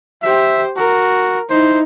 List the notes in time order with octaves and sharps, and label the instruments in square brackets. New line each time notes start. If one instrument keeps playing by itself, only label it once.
[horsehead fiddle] G4 C5 [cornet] E5
[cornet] F#4 [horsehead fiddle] A#4
[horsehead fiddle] D#4 E4 [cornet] C5